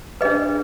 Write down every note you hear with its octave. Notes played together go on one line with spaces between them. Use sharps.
D4 G#4 B4 D#5